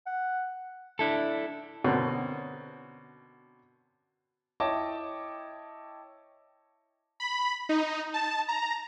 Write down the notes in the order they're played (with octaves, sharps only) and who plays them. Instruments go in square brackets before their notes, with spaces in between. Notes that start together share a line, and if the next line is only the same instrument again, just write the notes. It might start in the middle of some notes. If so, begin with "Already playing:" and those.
[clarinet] F#5
[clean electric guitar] D4 E4 A4
[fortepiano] B2 D3 A#3 C4 C#4
[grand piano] E4 C#5 D#5 G5 A5 D6
[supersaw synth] B5
D#4
A5
A#5